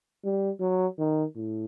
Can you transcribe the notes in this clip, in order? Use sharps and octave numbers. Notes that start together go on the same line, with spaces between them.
G3
F#3
D#3
A2